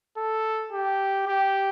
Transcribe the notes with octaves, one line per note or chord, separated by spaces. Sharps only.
A4
G4
G4